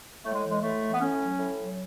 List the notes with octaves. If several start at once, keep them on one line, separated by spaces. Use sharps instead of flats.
A2 A3
G#3
E3
G#3
A2 A3
E3
B3
A2 C#4
F#3
A2
F#3